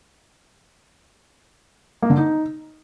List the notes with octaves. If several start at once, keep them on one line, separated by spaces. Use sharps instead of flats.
A#3
D3
D#4